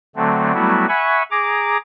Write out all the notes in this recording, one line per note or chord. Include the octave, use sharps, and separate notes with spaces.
D3 F#3 A3 C4
F#3 G3 A3 B3 E4 F#4
E5 F#5 G#5 B5 C#6
G#4 A#5 D6